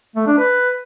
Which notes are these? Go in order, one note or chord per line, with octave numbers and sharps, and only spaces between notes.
A3
D4
B4